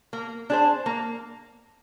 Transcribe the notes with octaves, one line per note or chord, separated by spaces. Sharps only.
A#3
D4 G#4 C5
A#3